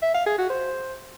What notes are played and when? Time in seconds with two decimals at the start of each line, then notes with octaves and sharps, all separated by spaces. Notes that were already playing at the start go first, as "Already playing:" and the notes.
0.02 E5
0.14 F5
0.26 G#4
0.38 F#4
0.50 C5